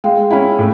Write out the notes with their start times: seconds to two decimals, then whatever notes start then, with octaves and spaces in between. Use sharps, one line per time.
0.04 G#3 F5 G5
0.30 C#4 E4
0.59 A2